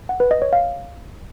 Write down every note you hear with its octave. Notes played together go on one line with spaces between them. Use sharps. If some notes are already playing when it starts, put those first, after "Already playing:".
F#5
B4
D#5
C#5
F5